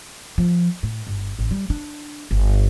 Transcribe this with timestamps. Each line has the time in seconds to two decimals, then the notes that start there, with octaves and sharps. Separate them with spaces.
0.38 F3
0.83 A2
1.07 G1
1.39 A1
1.51 G3
1.70 D4
2.31 G1